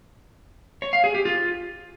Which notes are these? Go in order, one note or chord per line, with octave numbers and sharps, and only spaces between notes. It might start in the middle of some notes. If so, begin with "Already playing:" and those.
C#5
F5
G#4
G4
F4